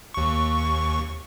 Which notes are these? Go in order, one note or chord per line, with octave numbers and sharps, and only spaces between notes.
D#2 C#6